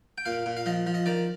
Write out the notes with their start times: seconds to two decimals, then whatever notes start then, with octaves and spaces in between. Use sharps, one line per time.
0.18 G5
0.26 A#2 F5
0.46 A#2
0.57 F5
0.66 F3 D#5
0.87 F3
0.94 D#5
1.06 D#3 D5